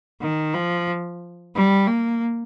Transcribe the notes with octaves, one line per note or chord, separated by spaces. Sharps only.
D#3
F3
G3
A#3